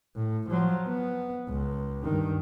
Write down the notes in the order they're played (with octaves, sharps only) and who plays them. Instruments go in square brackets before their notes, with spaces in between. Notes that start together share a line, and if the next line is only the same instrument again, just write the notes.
[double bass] A2
F3 F#3
B3
C#2
G2 D#3